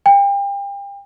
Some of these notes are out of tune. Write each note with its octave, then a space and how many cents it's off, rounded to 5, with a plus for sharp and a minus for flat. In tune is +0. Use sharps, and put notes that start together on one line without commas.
G5 +35